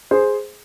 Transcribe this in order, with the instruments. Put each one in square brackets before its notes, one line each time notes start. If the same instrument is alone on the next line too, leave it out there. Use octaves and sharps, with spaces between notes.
[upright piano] G#4 C5